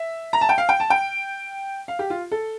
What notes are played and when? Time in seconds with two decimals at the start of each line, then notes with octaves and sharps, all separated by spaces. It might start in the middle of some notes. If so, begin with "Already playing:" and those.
Already playing: E5
0.33 A#5
0.41 A5
0.49 G5
0.58 F5
0.69 G5
0.80 A5
0.90 G5
1.88 F5
1.99 G4
2.10 F4
2.31 A4